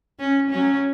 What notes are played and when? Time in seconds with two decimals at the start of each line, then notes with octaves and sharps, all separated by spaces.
0.19 C#4
0.50 F#3 C#4